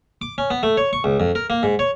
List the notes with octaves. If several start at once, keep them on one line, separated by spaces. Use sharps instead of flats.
D6
C#4
B3
A3
C#5
C#6
C#2
F2
A#4
A#3
G#2
C#5